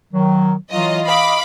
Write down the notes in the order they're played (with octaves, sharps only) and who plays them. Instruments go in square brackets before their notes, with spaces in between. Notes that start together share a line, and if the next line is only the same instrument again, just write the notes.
[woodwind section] D#3 F#3
[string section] E3 F4 D#5 [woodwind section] F#3
[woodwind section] D#5 [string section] F5 B5 D6